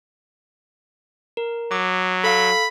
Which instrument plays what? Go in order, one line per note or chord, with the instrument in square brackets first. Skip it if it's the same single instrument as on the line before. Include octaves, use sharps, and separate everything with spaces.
[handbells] A#4
[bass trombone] F#3 [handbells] D6
[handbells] A4 F5 [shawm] B5